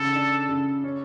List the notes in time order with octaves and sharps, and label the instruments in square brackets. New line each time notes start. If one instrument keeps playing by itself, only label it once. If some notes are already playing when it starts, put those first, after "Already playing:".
Already playing: [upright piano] C#3 [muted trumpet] A4
[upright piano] D4
C#3
C#4